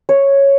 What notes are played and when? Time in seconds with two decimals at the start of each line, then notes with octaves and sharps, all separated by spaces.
0.09 C#5